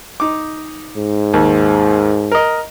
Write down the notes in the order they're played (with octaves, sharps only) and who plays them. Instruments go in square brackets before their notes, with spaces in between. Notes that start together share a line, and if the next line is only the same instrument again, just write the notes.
[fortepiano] D#4 D6
[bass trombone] G#2
[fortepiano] D#2
A#4 D#5